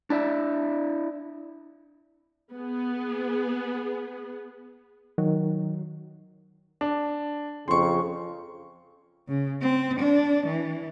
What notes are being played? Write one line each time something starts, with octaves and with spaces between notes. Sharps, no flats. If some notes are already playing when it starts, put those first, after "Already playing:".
D4 E4 D5 E5
B3 G#4
D#3 F#3
D4
F2 C#3 C6 C#6
C#3
C4
D4
E3